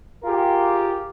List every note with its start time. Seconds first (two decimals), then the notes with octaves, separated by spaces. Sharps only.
0.22 F4 G4 G#4 A#4